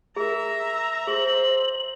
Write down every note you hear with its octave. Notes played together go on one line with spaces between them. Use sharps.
G#4 A#4 E5 A#5
G#4 C5 F#7